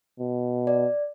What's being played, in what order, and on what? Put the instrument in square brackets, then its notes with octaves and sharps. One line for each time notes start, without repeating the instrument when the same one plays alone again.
[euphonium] B2
[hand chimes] D5